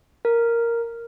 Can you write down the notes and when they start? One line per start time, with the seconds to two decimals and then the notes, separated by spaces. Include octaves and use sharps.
0.25 A#4